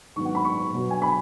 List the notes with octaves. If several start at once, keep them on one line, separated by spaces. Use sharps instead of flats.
G#2 D#3 F#3 B3 C#6
F#5
B5
C#6
B2 F#3 B3
G#5
B5